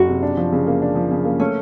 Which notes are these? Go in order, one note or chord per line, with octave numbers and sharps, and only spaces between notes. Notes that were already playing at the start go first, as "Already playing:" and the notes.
Already playing: F#1 F#4
C3
D4
F3
C#3
A#3
D4
F3
C#3
A#3
A3 C#4